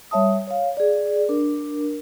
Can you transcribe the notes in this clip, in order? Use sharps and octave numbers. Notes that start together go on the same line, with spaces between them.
G3 C#5 E5 A5 D#6
C#5 F5
G#4 D5
D4 A#4